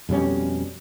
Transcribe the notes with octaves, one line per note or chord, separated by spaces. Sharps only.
F2 B2 G3 C#4